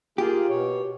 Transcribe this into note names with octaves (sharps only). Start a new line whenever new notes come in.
A#3 F4 G4 G#4
B2 C#5